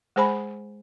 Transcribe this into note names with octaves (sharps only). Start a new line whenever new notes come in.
G#3 G#4 C5 G#5 B5